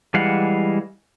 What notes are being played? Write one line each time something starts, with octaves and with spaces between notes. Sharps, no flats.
E3 G3 G#3 F5 F#5